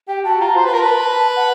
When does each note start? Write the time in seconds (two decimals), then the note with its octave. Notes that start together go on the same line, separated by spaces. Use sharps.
0.08 G4 G5
0.25 F#4 A5
0.40 F4 A#5
0.56 C5 C6
0.65 B4
0.73 A#4 A#5
0.77 B4 A5
1.05 A5
1.36 F#5